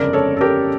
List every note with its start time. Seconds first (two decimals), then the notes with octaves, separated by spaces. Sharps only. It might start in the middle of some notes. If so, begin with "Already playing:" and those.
Already playing: G1 F2 C#3 A#4 D5
0.13 A4 C#5
0.37 A4
0.41 G4 A#4